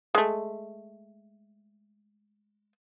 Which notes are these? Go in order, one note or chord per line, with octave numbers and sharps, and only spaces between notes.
G#3 A3